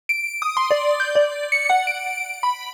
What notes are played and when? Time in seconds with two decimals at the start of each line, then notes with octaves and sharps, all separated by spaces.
0.09 D7
0.42 D#6
0.57 C6
0.71 D5
1.00 G6
1.15 D5
1.52 C#7
1.70 F#5
1.87 D7
2.43 B5